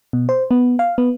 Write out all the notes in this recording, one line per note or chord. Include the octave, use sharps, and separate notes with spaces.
B2
C5
B3
F5
B3